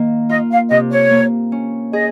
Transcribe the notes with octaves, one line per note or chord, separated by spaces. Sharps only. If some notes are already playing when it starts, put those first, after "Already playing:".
Already playing: D#3 A#3
F4 D#5
F5
C3 D#5
C#5
A#3
C#4
G#4 D#5